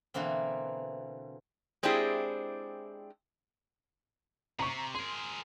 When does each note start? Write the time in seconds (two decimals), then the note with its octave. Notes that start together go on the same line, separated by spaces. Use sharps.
0.14 B2 D3 E3 A#3 C4
1.83 G#3 C4 D4 E4 G4 G#4
4.59 C3 A#5 C#6
4.95 G#4 A#4 C6